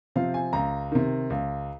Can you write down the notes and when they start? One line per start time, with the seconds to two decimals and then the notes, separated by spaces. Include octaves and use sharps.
0.16 C3 F3 C4 F5
0.34 G#5
0.53 C#2 A#5
0.92 C3 D#3
1.30 C#2